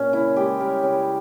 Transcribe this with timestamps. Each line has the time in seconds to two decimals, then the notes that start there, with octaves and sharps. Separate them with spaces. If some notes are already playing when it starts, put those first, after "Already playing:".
Already playing: A#2 C#4
0.13 C#3 E4
0.36 G#3 G4
0.59 G3 A#4
0.83 C#3